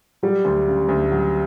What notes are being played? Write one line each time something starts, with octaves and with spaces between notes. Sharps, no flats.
F#3 G3
D2
C#3
D2
F#3